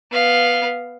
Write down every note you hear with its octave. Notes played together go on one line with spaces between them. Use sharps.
B3 F5